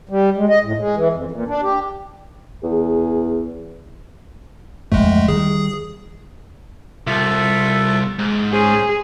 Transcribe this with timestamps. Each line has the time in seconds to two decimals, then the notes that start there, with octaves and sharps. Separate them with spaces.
0.09 G3
0.37 G#3
0.49 D#5
0.64 A2
0.78 G#3
0.97 E3
1.13 F2
1.31 A#2
1.48 D4
1.63 G4
2.63 E2 G#4
4.92 D1 G1 F2 G#3 A3
5.28 D#3 G3 G#4
7.07 C2 F4 A4 E5
8.19 G#2
8.53 C#4 G#4 C5